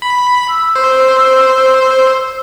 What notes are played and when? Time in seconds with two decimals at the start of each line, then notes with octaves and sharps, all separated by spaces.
0.02 B5
0.49 E6
0.76 C5